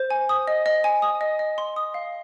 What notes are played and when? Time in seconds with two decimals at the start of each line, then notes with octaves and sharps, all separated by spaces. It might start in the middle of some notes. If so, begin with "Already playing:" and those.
Already playing: C5
0.10 G#5
0.29 D#6
0.48 D#5
0.66 D#5
0.84 G#5
1.02 D#6
1.21 D#5
1.39 D#5
1.58 C6
1.76 D#6
1.94 F5